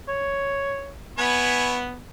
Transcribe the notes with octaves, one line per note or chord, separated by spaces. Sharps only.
C#5
B3 E4 B4 C#5 G#5